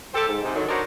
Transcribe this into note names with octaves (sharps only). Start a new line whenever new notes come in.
G4 A4 C5
G#2
G#2 C3
D3 D#3 F#3
D4 D#4 F#4 A#4 C5 C#5